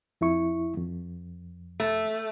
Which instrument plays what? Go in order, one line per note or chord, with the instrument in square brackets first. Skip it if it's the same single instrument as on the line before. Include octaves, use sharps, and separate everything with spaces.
[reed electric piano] F2 E4 C#6
F2
[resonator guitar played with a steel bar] A3